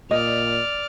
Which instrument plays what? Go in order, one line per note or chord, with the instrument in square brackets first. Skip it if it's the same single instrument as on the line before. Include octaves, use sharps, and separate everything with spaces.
[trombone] A#2 [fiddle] D5 F6 [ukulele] D#5